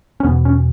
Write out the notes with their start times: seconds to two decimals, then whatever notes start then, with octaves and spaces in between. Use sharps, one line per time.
0.20 C#4
0.24 E2 B2 B3
0.45 C#4